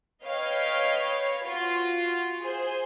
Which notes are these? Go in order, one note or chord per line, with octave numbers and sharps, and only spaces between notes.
B4 C#5 D#5 F5 G5
F4 F#4
G#4 C5